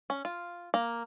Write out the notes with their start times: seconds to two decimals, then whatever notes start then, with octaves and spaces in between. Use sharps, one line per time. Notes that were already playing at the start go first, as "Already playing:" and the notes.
0.10 C#4
0.25 F4
0.74 A#3